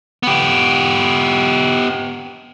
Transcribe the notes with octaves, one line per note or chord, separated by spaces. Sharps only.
B3 G4